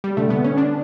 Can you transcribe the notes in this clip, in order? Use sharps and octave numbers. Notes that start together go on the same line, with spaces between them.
G3
D3 A3
B3
C#4
D4